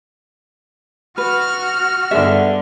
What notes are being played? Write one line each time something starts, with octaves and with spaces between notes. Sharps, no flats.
F#4 B4 F6
G2 D3 B3 G#4 E5